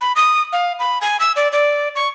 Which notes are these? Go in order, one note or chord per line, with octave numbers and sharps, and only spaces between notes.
B5
D#6
F5
B5
G#5
E6
D5
D5
C#6